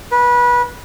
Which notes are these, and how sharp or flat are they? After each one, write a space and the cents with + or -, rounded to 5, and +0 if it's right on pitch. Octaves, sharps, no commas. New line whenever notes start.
B4 -25